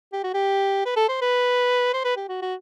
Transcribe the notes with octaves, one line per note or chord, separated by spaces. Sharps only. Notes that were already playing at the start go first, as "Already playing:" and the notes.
G4
F#4
G4
B4
A4
C5
B4
C5
B4
G4
F#4
F#4